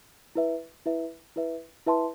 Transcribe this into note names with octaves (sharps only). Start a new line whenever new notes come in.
E4 B4 E5
E4 B4 E5
E4 B4 E5
E4 B4 E5 A5 C6